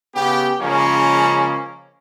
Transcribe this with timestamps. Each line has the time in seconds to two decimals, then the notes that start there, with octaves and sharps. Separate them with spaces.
0.14 C#3 B3 G4
0.60 C#3 F3 G#3 A#3 C#4